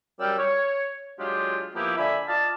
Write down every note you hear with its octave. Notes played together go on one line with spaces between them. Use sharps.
F#2 G3 D5 G5 E6 F6
C#5
F#3 G#3 D4 F4 G4
F3 A#3 B3 E4 G4
D3 E5 G#5 B5
F4 D5 D#5 F5 A5